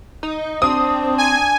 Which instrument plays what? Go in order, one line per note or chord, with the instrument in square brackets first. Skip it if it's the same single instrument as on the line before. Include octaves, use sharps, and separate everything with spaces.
[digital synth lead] D#4
[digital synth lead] C4 [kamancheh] D4 [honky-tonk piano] D#6
[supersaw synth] G#5